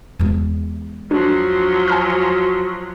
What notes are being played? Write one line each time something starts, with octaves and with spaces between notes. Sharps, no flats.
E2 G#3
F3 F#3 D4 F#4
G#5 A#5 F6